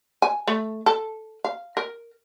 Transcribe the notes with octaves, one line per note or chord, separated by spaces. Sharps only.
G#5
A3
A4
F5
A#4